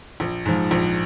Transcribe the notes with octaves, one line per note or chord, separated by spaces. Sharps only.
A#1
G#2 F3
A#1